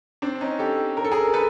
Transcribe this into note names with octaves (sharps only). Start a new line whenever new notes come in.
C4 D4
C#4 D#4
G4 A4
A#4
A4
G#4 A#4
A4 B4